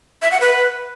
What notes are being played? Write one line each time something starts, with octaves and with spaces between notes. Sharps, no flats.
E5
F#5
B4